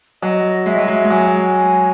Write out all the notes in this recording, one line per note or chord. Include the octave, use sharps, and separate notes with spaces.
F#3 D#5
G#3 E5
F#3
G#3
G#3
F#3 G#5